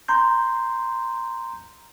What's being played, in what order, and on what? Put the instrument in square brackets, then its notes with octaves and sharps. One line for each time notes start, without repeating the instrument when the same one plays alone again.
[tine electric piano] A#5 C6 G6